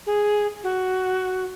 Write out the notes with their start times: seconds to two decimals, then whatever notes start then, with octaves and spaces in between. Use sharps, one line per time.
0.06 G#4
0.64 F#4